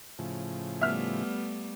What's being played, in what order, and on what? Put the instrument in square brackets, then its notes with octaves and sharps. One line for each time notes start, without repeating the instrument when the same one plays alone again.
[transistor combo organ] A2 C#3 F3
[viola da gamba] G3 A3 B3 [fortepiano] E5 F6